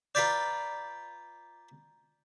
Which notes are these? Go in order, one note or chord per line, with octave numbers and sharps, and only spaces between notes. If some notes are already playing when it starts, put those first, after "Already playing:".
F4 B4 D5 A#5 G6